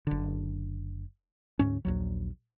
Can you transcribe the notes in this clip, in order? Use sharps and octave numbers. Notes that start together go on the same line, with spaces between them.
F#1 D3
D2 G#2 C#4
A#1 D#2 F#3